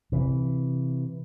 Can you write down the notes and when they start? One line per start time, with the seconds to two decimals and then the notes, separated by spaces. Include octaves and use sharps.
0.12 C3 E3